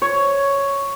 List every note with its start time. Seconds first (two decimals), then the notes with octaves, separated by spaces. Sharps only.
0.02 C#5